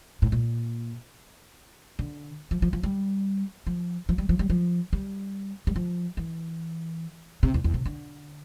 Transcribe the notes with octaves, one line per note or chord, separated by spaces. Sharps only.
A2
A#2
D3
F3
F3
F3
G3
F3
F3
G3
F3
G3
F3
G3
G3
F3
E3
C3
E2
E2
C3
D3